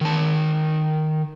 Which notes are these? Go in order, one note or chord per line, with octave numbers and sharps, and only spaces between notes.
D#3 A5